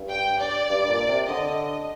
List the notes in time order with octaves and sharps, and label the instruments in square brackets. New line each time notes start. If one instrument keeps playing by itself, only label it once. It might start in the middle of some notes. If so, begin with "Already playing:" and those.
Already playing: [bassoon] G2
[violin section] G5
D5
[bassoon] G2
A#2
C3
[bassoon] D3 [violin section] D#5